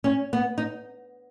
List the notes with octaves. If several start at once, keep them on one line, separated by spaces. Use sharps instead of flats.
C#4
B3
D#4